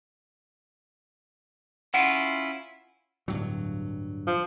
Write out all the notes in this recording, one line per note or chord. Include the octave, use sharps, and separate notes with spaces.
C#4 E4 F4 F#5
D1 G2 F#3
F3